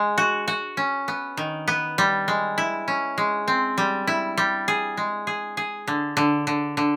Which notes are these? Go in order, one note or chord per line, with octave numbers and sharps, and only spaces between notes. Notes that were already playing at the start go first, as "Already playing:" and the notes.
Already playing: G#3
F#4
F#4
C#4
B3
D#3
B3
G3
G#3
E4
C#4
G#3
C4
G3
E4
G3
G#4
G#3
G#4
G#4
D3
D3
D3
D3